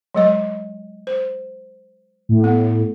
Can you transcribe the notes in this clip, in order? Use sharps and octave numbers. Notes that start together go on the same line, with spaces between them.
F#3 G#3 D#5
C5
A2
B3